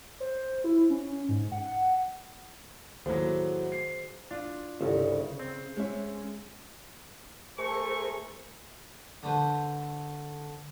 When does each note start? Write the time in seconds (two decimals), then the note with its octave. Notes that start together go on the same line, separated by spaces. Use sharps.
0.20 C5
0.64 E4
0.90 C#4
1.29 G#2
1.52 F#5
3.06 D#2 A2 F#3 F#4 G#4 C5
3.72 C7
4.31 D4 F4
4.81 G1 C2 C#3
5.39 C4
5.77 G#3 C#4 E5
7.58 A3 G#4 A#4 C5 C#6
9.23 D3 A3 B4 C5